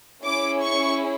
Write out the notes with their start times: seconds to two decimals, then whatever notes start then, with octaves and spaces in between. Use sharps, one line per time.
0.24 C#4 E4 G#4 D6
0.60 C#6